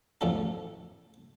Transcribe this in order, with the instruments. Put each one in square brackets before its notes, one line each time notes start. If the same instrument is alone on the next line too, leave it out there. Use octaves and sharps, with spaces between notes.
[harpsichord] A1 E2 F3 C#4 A4